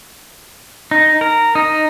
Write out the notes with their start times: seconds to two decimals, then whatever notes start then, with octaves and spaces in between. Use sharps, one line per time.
0.91 D#4
1.21 A#4
1.55 D#4